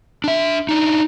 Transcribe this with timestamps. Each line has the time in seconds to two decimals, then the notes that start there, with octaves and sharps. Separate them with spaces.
0.24 D4 E5
0.69 D4 D#4